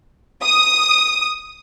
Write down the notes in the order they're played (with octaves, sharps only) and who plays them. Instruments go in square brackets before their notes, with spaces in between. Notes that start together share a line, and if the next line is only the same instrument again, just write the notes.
[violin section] D#6